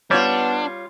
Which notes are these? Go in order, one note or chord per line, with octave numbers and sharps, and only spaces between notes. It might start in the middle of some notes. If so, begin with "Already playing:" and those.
G3 B3 D4 F4 C#5